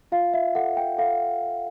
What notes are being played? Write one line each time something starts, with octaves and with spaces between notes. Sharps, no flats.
F4 F5
E5
A4 F#5
G5
A4 F5